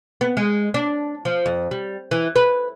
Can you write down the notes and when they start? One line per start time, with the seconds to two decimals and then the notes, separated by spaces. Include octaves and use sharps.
0.21 B3
0.37 G#3
0.74 D4
1.25 F3
1.46 F2
1.71 G3
2.11 E3
2.36 B4